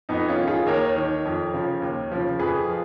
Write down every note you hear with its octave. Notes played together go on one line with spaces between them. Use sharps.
F2 B3 D#4
C#4 F4
D#3
F4 G#4
D#2 A#4 C#5
D#3
F2
C#3 F3
D#2
C#3 F3
F2 G#4 B4
F3